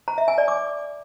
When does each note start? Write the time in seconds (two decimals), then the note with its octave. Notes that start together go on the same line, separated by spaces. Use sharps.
0.08 A#5
0.18 E5
0.28 G#5
0.38 D5
0.48 D6